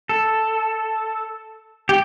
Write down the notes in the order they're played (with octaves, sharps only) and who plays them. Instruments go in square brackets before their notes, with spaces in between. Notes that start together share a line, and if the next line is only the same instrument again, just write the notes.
[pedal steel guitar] A4
G4